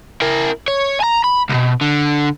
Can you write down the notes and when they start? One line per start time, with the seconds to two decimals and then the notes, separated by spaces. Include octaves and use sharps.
0.22 E4 A#4
0.68 C#5
1.01 G#5 A#5
1.24 B5
1.49 C2 B2
1.81 D3